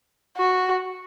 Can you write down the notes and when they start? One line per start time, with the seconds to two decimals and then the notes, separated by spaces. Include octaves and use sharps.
0.37 F#4